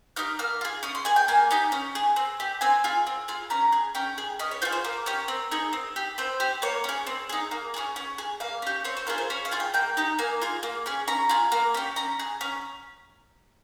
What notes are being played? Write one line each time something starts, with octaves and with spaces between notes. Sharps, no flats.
D#4 G4 F6
A#3 F6
F4 G#4
C#4 D#6
C6
G#4 G#5
G5
A#3 G#5
D#4 G4
C#4
G#4
C4
G4
C4 G#5
F4 G#4
C4
F4 G#4
C#4 A#5
G#4
C#4 G5
G#4
C#4 D#5
C#5
F4 G#4 C5
C5
A#3 A#4
C#4 G4
C4
D#4 G#4
C4
G4
C4 C5
G4
A#3 C#5
C#4 G#4
C4
D#4 G#4
A#3
C#4 F4 G#4
C#4
G#4
A#3 F5
C#4 G4
C4 C#5
C5
F4 G#4 A#4
C5
C#4 C#5
F5
F4 G#4
G5
A#3 G5
D#4 G4
A#3 G#5
F4 G#4
A#3
C#4 G#4
C#4 A#5
F4 G#4
A#3
C#4 G4
C#4 A#5
G#4
C#4